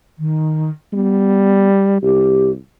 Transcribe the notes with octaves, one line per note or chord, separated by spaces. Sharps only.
D#3
G3 B3
C2 G4